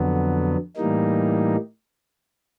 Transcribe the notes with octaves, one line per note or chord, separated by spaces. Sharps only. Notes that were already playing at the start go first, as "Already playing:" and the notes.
Already playing: F2 D3 F#3 B3
A2 E3 G3 A#3 D#4